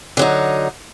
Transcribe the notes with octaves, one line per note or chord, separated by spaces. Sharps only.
D3 F#3 D#4